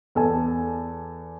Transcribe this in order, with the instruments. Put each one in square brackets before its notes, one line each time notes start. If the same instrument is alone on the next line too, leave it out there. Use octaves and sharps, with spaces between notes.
[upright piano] E2 A4 G#5